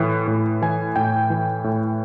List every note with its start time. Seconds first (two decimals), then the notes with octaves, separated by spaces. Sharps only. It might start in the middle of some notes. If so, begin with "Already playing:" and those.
Already playing: A2 E3
0.28 A2
0.62 E3 G#5
0.96 A2 G5
1.30 E3
1.64 A2